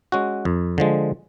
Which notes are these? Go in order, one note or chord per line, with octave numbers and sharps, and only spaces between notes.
G#3 C#4 F#4
F2
D3 F3 G#3